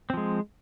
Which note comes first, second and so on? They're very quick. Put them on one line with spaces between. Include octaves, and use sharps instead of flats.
C4 F3 G#3